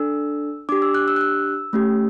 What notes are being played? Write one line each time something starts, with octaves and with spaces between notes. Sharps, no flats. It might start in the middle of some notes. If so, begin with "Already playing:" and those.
Already playing: D4 A4 E6
D4 G4 D6
E6
F#6
E6
F#6
E6
A3 C#4 G4